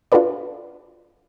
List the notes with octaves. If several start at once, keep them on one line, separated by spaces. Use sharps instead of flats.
D4 F4 F#4 A4 B4 D5